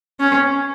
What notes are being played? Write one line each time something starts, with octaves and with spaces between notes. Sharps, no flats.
C#4